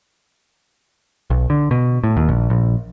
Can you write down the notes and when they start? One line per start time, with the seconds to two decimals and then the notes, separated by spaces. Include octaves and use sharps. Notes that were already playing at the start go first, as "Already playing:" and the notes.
1.30 B1
1.50 D3
1.71 B2
2.04 A2
2.17 D#2
2.29 A#1
2.50 A#1